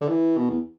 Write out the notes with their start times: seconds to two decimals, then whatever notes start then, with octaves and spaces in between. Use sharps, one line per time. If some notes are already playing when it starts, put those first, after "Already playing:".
0.01 D3
0.09 E3
0.38 B2
0.50 E2